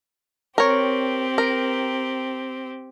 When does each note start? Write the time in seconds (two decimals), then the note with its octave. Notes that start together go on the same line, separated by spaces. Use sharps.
0.58 C4 G4 A#4 C#5
1.38 A#4